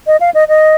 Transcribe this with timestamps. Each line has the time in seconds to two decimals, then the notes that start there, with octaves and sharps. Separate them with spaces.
0.07 D#5
0.21 F5
0.34 D#5
0.49 D#5